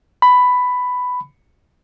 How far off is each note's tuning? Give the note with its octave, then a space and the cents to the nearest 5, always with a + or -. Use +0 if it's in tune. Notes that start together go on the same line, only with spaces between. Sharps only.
B5 +10